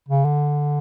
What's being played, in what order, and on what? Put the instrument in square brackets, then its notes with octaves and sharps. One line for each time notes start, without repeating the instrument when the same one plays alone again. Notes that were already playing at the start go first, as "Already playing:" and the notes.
[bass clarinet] C#3
D3